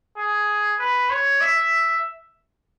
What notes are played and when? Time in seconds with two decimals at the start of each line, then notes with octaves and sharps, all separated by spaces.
0.17 G#4
0.79 B4
1.10 C#5
1.41 E5